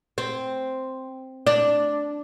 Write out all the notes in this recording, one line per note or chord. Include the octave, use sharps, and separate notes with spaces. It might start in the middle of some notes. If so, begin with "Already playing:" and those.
C4
D4